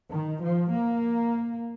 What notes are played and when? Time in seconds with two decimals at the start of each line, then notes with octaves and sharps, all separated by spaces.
0.12 D#3
0.42 F3
0.73 A#3